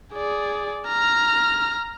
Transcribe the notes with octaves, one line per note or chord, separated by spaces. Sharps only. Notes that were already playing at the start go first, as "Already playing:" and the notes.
G#4 D5
A#5 F6